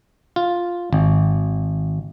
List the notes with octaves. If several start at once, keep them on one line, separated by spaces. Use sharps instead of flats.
F4
G#1